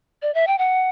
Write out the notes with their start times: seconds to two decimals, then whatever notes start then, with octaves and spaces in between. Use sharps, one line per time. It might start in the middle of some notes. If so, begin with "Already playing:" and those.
0.22 D5
0.35 E5
0.47 G5
0.58 F#5